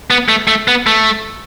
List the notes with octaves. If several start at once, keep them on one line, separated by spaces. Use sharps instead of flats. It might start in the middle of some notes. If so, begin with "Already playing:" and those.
B3
A3
A3
B3
A3